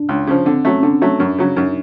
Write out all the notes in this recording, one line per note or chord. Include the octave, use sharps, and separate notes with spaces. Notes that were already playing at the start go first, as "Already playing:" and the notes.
Already playing: D4
C#2
C#3 F3
D3 C4
F#3 A3 C#4
D3 D4
F#3 A3
F#2
C#3 F#3
F#2 D#4